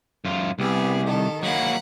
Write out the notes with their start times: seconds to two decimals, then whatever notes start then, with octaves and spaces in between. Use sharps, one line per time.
0.25 F#2 F4
0.59 C2 B3 G4 G#4
1.05 D#3 A4
1.43 F#3 A#3 F#5 B5